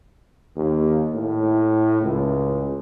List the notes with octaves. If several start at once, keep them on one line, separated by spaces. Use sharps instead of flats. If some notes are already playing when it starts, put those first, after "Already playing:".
D#2
A2
C#2